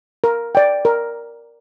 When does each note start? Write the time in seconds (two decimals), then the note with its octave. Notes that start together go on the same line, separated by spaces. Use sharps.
0.24 A#4
0.55 D5 G5
0.85 A#4